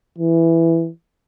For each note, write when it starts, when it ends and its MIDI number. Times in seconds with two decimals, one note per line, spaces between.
0.18 0.89 52